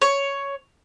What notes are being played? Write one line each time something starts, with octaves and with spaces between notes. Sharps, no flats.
C#5